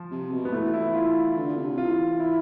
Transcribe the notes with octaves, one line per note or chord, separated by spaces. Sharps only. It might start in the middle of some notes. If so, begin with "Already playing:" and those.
Already playing: F3
C3
B2
B3
E3 A3
E4
F4
D3
C3
E3 F4
E4